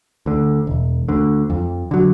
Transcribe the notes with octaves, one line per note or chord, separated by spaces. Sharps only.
D2 D3
E1
D2 D3
F2
D3 F#3